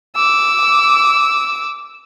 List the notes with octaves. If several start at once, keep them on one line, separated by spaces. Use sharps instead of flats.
D6 E6